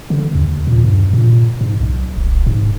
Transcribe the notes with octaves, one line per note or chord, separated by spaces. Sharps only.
D3
D#2
A#2
G2
A#2
G#2
B1
D1
G#2